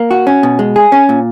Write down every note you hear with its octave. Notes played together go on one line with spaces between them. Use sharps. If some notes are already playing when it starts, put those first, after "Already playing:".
Already playing: A#3
F#4
C#4
B2
G#3
G#4
C#4
A#2